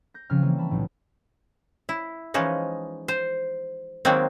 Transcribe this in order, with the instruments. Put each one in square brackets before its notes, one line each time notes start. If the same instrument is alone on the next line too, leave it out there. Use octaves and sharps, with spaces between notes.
[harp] G6 A#6
C#3 F3 C4 C#4 G#5 F6
E3 G3 A#3
A5 B5
B1 A2
[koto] E4
E3 F3 G#3 C#4 D#4
C5
D#3 F#3 G#3 A#3 C4